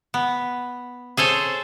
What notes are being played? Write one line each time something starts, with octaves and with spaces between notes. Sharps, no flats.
B3
G#4 A4 C5 C#5